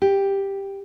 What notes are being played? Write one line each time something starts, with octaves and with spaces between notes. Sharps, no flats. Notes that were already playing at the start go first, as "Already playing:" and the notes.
G4